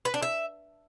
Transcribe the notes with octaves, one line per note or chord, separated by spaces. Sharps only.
B4
D4
E5